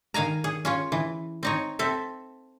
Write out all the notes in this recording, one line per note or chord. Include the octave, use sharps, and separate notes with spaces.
D#3 F5 G#5 A#5
G#4
C#4 F4 C#5
E3
C4 D#4 C#5
C4 A4 E5